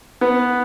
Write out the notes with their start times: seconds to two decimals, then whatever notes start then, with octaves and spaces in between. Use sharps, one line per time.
0.21 B3